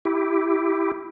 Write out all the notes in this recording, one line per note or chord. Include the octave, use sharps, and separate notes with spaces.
E4 G4